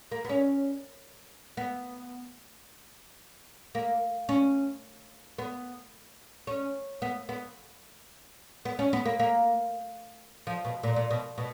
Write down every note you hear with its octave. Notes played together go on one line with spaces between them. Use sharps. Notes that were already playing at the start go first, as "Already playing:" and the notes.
A#3
B3
C#4
B3
A#3
C#4
B3
C#4
B3
B3
B3
C#4
B3
A#3
A#3
F3
B2
A#2
A#2
B2
B2